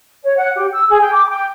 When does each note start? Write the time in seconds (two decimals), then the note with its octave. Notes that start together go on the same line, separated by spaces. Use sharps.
0.23 C#5
0.37 F#5
0.57 G4
0.73 E6
0.90 G#4
1.01 G5
1.14 D6
1.30 G5